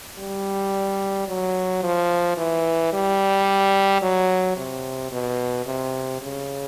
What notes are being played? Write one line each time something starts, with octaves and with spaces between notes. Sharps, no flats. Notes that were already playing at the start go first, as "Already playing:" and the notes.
G3
F#3
F3
E3
G3
F#3
C3
B2
C3
C#3